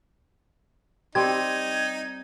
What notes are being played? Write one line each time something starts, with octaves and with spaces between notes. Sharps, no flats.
G3 C4 D#4 G#6